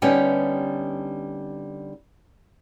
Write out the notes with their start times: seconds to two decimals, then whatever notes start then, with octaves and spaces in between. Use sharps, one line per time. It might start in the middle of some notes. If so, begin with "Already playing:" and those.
0.02 D3 G3 B3 C#4 D#4 G4